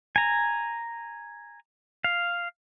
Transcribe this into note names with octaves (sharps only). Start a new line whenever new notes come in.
G#5 A#5
F5